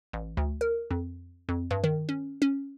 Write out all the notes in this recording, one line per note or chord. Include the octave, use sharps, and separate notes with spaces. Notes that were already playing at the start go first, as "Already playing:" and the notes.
A1
D2
A#4
F2
F2
G2
D#3
C#4
C#4